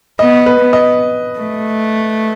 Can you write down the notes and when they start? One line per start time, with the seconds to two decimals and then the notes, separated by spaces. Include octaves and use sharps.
0.19 B3 D#5
0.46 B4
0.60 B3
0.73 D#5
1.39 A3